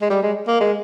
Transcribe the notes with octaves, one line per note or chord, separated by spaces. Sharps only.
G#3
G3
G#3
A#3
G#3